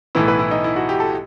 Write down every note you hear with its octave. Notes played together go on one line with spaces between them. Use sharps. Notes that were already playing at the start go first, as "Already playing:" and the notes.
B1 A2 E3 B3 E4
B4
E4
D#4
E4
F#4
G4
A4